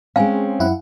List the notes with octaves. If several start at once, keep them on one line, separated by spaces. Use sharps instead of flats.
G#3 C4 C#4 F5 G#5
F#2 E4 F#5